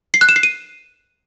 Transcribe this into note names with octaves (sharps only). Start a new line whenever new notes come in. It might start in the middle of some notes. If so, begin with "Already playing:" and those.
C7
F#6
E7
C7
D#7